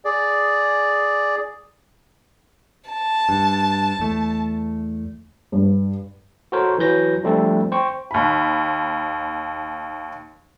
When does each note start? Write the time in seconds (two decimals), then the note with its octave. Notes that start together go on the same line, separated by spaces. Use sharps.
0.05 G#4 D5
2.90 A5
3.29 G2
3.99 E2 A3
5.52 G2
6.52 F#4 A4 A#4 C5 C#5
6.78 E3 F#3 B4 G6 A#6
7.23 F3 G3 A3 C4 D4 A4
7.72 C5 G5 C#6
8.11 D#2 B5